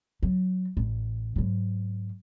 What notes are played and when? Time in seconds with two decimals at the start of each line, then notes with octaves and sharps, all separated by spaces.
0.23 F#3
0.77 A1
1.36 G#2 F#3